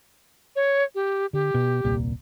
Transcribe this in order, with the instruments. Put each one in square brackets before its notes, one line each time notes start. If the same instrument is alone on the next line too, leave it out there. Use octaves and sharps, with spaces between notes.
[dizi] C#5
G4
[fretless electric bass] D3 [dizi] G4
[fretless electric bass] B2
D#1 C2 A#2